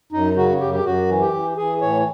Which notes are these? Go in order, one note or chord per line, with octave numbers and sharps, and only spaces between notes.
F#2 D#4
C#3 F#4
F#2 G4
G4
F#2 F#4
E3
G4
E3
E3 G#4
A2 C#5